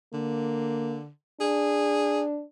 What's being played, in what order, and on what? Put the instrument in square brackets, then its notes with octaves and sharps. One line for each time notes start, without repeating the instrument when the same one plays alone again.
[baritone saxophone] D3 [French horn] A#3
[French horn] D4 [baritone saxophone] G#4